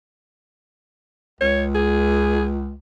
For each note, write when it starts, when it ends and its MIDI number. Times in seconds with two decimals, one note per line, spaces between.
1.41 2.75 37
1.41 1.63 73
1.75 2.46 68